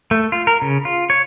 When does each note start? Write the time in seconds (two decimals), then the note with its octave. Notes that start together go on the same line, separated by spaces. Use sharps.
0.11 A3
0.32 F4
0.47 A#4
0.62 C#3
0.85 F4
1.10 C#5